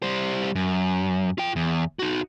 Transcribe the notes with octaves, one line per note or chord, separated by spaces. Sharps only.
G3 C5
F#2
F4 G5
E2
D#4 F#4